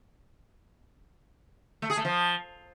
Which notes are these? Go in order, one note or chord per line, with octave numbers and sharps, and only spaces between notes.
A3
G#4
A3
F3